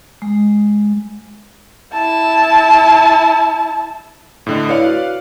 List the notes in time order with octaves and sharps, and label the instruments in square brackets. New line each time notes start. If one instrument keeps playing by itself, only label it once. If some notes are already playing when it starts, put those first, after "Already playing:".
[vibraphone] G#3
[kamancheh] E4 A5
[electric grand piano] A2 D3 D#5
[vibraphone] E4 C#5 [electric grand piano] B4 D5 F5
[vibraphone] F#4